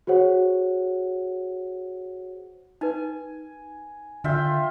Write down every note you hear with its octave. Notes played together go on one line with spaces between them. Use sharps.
F#4 G#4 C5 C#5 F#5
D#4 B4 G#5
D3 F4 E5 G5